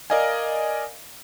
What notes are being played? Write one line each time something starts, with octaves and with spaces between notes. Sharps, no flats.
A#4 D5 D#5 F5 G#5